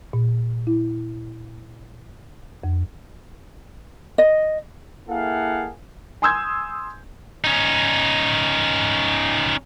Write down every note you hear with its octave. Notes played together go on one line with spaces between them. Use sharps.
A#2
E4
F2
D#5
A#3 E4 G#4 A4 F5 F#5
G#5 C6 D#6 E6 G6 G#6
C#4 D#4